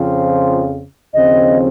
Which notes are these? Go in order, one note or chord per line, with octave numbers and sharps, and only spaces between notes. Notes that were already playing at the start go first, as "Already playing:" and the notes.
Already playing: F2 C#3 F3 C4 F4
D#2 C#3 F3 C4 D#5